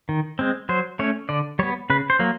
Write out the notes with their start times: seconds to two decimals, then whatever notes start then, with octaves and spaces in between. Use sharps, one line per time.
0.09 D#3
0.39 G#3 C4
0.69 F#3 C5
0.99 A3 C#4 C#5
1.29 D3 D5
1.59 G3 B3 C#5
1.90 C#3 B4
2.10 C5
2.19 F#3 A#3